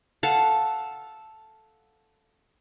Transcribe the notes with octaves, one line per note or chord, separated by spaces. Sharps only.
A4 F5 F#5 A5